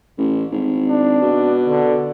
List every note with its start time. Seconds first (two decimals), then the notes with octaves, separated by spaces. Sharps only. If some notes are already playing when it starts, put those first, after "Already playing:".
0.18 A1
0.52 G#1
0.88 D4
1.22 B2
1.68 D3